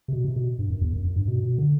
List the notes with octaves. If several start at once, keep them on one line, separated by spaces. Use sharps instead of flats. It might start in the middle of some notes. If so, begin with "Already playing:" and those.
C3
B2
C3
B2
G2
F#2
E2
F#2
F#2
G2
B2
B2
D3